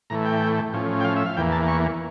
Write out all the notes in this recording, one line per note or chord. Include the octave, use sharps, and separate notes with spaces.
A2 E3 A3 A#5
G5
A2 F3 C#4
G5
F5
E5
F5
E2 E3 A#3 G5
A5
C#6